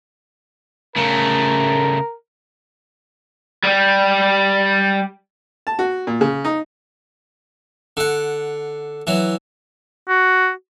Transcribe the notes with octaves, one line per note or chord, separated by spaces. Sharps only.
C#3 A3 A#4
G3 G4
A5
F#4
A#2
C#3
D#4
D3 F#5
E3 F#3
F#4